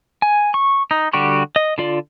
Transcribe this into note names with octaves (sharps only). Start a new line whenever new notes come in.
G#5
C#6
D#4
D3 G3 F#4 G4 C#6
D#5
D3 F4 D5